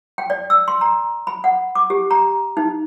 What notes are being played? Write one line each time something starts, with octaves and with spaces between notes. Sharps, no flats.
G5
D5
E6
C6
A#5
B5
F#5
D6
G4
A#5
D#4